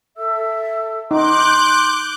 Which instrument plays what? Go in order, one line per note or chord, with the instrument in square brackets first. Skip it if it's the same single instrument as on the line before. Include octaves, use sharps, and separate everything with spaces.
[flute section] A4 E5 E6
[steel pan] D#4 [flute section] C6 [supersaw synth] D6 F#6 G6